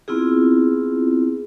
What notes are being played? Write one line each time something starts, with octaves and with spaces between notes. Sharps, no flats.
B3 C4 E4 F4 G#4